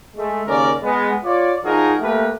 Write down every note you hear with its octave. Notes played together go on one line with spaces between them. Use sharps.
G#3 A3
D#2 C#3 C#4 A#4 D5
G#3 B3
F4 C#5 D5
F3 D#4 F#4 G#4 A#4
A3 A#3 G4 A#4 B4